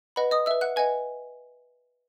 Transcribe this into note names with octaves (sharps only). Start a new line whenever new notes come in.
B4 D#5 F#5 B5
D#5 D#6
B4 E5 E6
F#5 F#6
B4 D#5 F#5 G#5 G#6